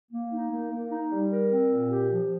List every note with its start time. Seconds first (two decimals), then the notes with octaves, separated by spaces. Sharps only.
0.12 A#3
0.32 D#4
0.52 A#3
0.71 A#3
0.91 D#4
1.11 G3
1.31 A#4
1.50 C4
1.71 A#2
1.89 G4
2.10 F3